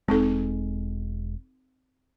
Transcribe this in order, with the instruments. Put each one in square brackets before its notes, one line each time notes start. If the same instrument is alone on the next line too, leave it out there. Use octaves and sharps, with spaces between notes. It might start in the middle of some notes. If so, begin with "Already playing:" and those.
[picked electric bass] E1 G#3 [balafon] C4 D#4 A4